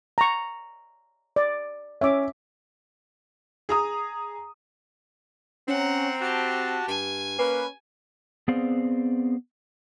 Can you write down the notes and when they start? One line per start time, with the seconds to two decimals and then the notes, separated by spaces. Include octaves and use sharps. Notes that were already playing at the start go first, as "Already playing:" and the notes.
0.18 A#5 C#6
1.36 D5
2.01 C#4 E5 D6
3.69 G#4 A#5 D#6
5.68 C4 C#4 F#5 A#5
6.21 F#4 G4 A5
6.88 G2 G#5
7.39 A#3 C#4 B4
8.48 B3 C4 G#4 C5 D5 F5